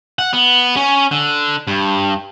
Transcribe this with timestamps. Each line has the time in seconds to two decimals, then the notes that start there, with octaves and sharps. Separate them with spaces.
0.19 F#5
0.33 B3
0.76 C#4
1.11 D3
1.67 G2